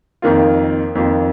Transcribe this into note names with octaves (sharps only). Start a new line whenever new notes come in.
F2 D#3 A#3 F4
F2 D#3 A#3 F4